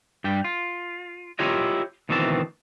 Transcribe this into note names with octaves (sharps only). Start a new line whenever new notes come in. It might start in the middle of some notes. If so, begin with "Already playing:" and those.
G2 G3 G5
F4
E4 F4 G4 A#4 C#5 D#5
D2 B2 D#3 E3 C4 A5